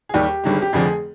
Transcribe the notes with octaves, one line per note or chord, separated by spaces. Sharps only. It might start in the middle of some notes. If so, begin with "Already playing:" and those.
G#4
D#2 D#3 G3 G4
G1 G2 D#3 G#3
G4
F1 F2 D3 F3 G#4